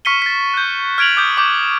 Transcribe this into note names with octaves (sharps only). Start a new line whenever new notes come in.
C#6 F6 B6 C#7 D#7 G7
A6 B6
F#6 G6
F6 G#6 D7 F7 F#7
D6 D#6 G6
C#6 D6 G6